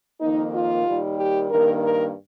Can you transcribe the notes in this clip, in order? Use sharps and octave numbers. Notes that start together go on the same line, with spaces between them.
F2 D#3 A#3 D#4
F4
D#2 D#3 G3
G4
G2 D#3 A#3 A#4
A#4